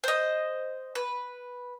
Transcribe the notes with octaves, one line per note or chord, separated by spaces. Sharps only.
C5 D#5
B4